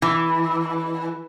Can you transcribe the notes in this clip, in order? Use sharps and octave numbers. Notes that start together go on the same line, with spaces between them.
E3